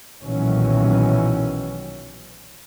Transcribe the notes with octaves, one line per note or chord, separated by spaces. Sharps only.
B1 A#2 D#3 E3 F#3 C#4